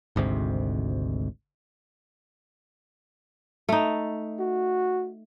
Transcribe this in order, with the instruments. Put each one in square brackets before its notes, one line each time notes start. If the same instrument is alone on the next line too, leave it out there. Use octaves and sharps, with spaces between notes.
[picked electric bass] G#1 D2 G#2 C3
[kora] A3 D#4
[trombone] F#4